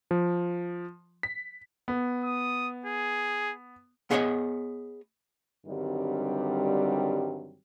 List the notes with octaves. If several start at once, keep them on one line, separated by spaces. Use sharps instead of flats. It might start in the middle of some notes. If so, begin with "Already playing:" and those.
F3
B6
B3
D#6
G#4
B3 G#4 C#5 D#5 F#5 G#5
G2 D3 D#3 F#3 G3 C4